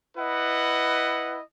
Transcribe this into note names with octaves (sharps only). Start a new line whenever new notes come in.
E4 B4 D#5 F#5